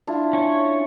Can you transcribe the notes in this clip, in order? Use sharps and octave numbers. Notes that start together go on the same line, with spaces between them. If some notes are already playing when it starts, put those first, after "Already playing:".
D4 E4 F4
C#4 C#5